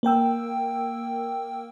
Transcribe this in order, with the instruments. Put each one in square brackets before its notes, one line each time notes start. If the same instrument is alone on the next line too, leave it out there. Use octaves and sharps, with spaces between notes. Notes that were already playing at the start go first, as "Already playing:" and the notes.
[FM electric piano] A#3 A#4 G5 E6